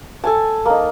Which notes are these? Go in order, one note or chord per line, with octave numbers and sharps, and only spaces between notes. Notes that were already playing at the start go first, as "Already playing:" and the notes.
A4 G#5 A5
A#3 D#4